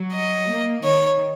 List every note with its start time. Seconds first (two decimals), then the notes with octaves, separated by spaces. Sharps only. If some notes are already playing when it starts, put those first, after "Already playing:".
Already playing: F#3
0.13 D#5
0.48 A#3
0.83 D#3 C#5